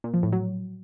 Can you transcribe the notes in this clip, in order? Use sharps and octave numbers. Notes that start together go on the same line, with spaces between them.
A#2
F3
A2
F#3